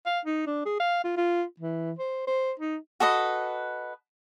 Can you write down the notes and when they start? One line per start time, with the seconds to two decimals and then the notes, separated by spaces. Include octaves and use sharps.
0.06 F5
0.25 D#4
0.47 D4
0.65 G#4
0.80 F5
1.04 F4
1.17 F4
1.60 E3
1.99 C5
2.27 C5
2.60 D#4
3.00 F#4 A4 B4 D#5